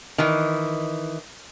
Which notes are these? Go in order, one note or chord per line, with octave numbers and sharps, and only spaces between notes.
D#3 E3